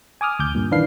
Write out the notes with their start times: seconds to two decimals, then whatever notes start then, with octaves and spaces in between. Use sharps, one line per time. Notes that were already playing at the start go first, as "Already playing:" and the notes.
0.21 G#5 D6 D#6 F6
0.39 D2 D6 G6
0.55 G2 A#2
0.71 D#3 E3 D4 B4 F5 C7